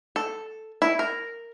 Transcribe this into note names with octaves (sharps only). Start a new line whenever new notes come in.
A4
E4
A#4